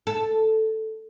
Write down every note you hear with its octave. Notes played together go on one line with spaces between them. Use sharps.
A4